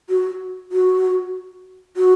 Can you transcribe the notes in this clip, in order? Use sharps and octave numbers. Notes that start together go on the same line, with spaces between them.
F#4
F#4
F#4